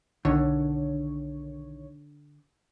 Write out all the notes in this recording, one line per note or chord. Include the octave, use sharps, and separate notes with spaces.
B1 D3 D#3 C#5